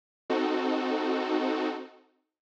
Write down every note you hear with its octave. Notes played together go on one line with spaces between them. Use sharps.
C4 D#4 F#4 A4